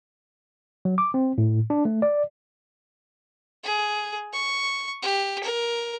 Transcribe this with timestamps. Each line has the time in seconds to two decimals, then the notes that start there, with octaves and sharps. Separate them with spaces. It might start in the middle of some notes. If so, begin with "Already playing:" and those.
0.85 F#3
0.98 D6
1.14 C4
1.38 A2
1.70 D4
1.85 A3
2.02 D5
3.64 G#4
4.33 C#6
5.02 G4
5.43 A#4